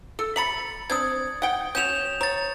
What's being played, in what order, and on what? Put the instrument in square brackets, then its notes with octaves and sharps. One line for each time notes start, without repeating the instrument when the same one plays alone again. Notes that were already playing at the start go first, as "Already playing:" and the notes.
[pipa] A4
[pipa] E5 A#5 B5 [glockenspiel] A6 C#7 F#7
[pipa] C4 D4 [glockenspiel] D#6 G#6
[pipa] F#5 G5
[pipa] F#3 C#4 [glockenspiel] G6 E7 F7
[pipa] C#5 [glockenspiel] A#5 A6